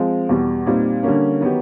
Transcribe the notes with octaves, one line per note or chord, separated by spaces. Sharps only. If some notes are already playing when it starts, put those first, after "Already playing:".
Already playing: F3 G#3 C4
E2 B2 G3
A#2 G3 C4 D#4
D3 G3 A#3 C#4
D#3 F#3 B3 D#4 G4